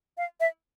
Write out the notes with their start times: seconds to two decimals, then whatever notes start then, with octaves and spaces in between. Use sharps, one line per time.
0.18 F5
0.40 E5